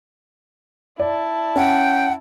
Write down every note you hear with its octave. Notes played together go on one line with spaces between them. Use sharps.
E4 D5 A5
C#4 F#5 G5